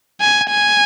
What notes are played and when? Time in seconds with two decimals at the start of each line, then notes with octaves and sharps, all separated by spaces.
0.21 G#5
0.50 G#5